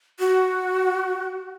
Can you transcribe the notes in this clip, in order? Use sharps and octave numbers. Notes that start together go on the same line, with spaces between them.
F#4